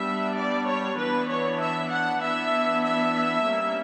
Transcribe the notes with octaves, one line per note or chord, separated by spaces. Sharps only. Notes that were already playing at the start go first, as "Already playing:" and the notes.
Already playing: G3 B3 D4 E5
D5
C#5
E3 B3 D4 B4
C#5
E5
F#5
E3 B3 D4 E5
E5
G3 A#3 C#4